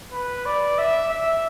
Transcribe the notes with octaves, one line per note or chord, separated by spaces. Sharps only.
B4
D5
E5
E5